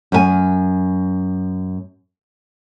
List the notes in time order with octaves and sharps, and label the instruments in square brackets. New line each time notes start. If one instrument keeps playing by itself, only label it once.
[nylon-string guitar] F#2 A4 G#5